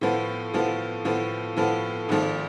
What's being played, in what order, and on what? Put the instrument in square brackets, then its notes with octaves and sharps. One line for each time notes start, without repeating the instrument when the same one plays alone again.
[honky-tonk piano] A2 F3 B3
A2 F3 B3
A2 F3 B3
A2 F3 B3
G#1 G#2 F3 A3